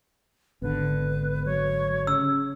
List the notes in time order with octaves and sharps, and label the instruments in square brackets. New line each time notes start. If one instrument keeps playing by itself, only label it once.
[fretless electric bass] G#1 D3 [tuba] B3 [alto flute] B4
[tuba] F#3 [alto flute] C#5
[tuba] C#3 [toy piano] E6